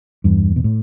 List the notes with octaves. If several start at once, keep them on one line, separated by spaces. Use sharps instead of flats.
E2 G2
B2
A2